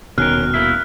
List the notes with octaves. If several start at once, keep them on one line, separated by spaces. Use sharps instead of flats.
D#1 B2 D#3 C#4 A#4 F6 F#6
A#3 E4 E5